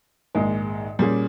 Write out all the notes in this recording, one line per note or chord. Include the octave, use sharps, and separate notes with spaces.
A#1 G#2 D#3 G#3
A#2 G3 C#4 G#4